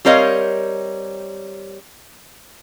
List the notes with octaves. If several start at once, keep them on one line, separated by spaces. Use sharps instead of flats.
G3 C4 A#4 C#5 D#5 F5